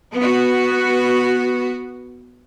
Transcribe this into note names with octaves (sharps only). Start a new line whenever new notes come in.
B3 F#4